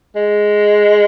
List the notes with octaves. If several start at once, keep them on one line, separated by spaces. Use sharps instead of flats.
G#3